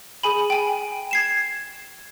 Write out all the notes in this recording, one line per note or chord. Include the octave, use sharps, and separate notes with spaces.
G#4 G#5 B5
G5 G#5
G#6 C7 E7